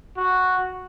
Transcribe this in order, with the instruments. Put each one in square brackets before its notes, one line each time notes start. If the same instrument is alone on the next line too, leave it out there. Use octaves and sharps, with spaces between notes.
[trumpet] F#4